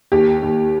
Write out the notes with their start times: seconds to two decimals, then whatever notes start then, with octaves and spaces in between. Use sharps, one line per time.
0.12 D#2 G4
0.43 D#2